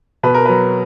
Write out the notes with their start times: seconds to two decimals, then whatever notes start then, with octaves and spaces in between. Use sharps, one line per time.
0.23 B2 B4
0.34 A#4
0.46 F#3 B4